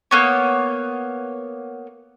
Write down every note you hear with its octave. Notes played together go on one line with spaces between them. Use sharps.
A#3 B3 C#5